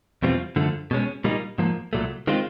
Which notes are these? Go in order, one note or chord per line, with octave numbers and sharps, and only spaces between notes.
E2 B2 G3 C4 F4
F#2 D3 F3 A3
B2 G#3 C#4
A#2 G3 A#3 D#4
G#2 F3 A#3
C2 A#2 F#3 A3
D#3 G#3 C4 F4